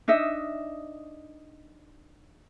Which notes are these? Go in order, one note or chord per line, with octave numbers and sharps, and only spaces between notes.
D4 D#4 D#5 E5